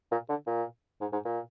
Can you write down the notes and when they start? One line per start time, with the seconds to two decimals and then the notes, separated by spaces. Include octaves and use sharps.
0.12 A#2
0.29 D3
0.47 A#2
1.01 G#2
1.13 G#2
1.25 A#2